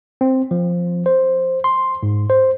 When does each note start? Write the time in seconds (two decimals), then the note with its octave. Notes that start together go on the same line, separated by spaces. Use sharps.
0.21 C4
0.51 F3
1.06 C5
1.64 C6
2.03 G#2
2.30 C5